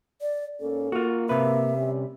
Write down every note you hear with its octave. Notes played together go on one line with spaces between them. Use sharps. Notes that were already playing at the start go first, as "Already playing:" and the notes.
D5
G#2 A#3 C#4 A4
A#3 F4 F#4
C3 B4 E5
G3 C#4